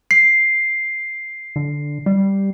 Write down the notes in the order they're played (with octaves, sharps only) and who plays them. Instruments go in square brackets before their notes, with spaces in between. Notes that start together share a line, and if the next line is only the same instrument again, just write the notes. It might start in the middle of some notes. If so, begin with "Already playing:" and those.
[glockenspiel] C7
[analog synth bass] D3
G3